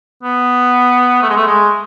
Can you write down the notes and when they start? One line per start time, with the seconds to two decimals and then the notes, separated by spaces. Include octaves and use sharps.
0.23 B3
1.23 A3
1.29 G#3
1.36 A3
1.47 G#3